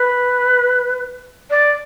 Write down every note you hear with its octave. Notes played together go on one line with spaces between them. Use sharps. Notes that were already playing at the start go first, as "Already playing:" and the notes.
Already playing: B4
D5